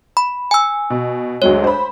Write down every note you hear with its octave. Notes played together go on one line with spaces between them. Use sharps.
B5
G#5 E6
B2
D2 F#3 G#3 C#5
C5 B5